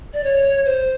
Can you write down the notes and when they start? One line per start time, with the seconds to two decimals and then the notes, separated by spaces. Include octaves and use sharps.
0.13 D5
0.24 C#5
0.65 C5